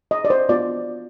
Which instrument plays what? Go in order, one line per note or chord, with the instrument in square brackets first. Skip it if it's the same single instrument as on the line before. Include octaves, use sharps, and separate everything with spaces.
[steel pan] D#5
D5
C5
B3 F4 D5